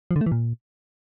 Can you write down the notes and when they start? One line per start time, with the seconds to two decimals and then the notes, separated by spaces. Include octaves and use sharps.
0.11 F3
0.16 D3
0.21 A3
0.26 E3
0.32 A#2